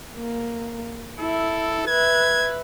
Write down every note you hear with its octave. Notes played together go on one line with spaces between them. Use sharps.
A#3
E4 A4
B4 E5 G#6